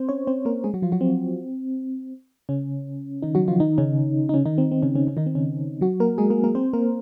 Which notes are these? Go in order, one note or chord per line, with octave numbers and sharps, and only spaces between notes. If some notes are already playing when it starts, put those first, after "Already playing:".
Already playing: C4 C5
C#4 C#5
C4 C5
A#3 A#4
G#3 G#4
F#3 F#4
F3 F4
F#3 F#4
C4
C#3 C#4
D#3 D#4
F#3 F#4
F3 F4
D#3 D#4
C#3 C#4
D#4
C#3 C#4
D#3 D#4
C4
C4
C#3 C#4
C#3 C#4
C#3 C#4
D#3 D#4
C4
C#3 C#4
F#3 F#4
A#3 A#4
G#3 G#4
A#3 A#4
A#3 A#4
C4 C5
A#3 A#4